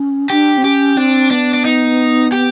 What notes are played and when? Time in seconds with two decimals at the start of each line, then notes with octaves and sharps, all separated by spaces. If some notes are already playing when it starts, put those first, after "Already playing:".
Already playing: C#4
0.30 D4 G4
0.58 C4
0.64 C#4 G4
0.97 C4 D4
1.31 B3 D4
1.54 D4
1.65 D#4
2.32 G4